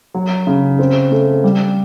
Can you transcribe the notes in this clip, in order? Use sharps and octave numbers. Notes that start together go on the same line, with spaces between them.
F#3
C#3
C4
A3
G3